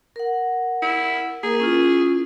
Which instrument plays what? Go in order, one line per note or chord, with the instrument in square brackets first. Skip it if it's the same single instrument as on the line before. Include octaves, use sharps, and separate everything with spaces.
[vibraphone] A#4 F#5
[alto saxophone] E4
[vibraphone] A#3 A#4 [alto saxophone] G#4
[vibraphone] C#4 E4 F4